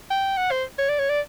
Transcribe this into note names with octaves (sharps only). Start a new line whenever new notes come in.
G5
F#5
C5
C#5
D5
C#5
D5